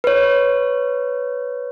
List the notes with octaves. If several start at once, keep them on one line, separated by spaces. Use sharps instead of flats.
B4 C#5